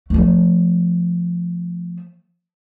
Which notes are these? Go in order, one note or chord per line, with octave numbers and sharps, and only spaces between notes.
F3 A3